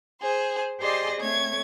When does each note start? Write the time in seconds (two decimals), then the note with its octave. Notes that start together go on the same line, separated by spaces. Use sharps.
0.21 G#4 C5
0.79 G4 G#4 C5 D5 D#5 C6
1.20 A3 C4 C#5 G#6